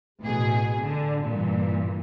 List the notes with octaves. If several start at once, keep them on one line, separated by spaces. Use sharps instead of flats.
A1 B2 G#4
D3
G2 A#2 E3